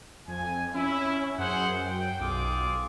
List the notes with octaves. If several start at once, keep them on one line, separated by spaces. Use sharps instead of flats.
F2 G#5
C#4 E4
F#2 G#4 C5 F#5
G5
B1 F4 G#4 D6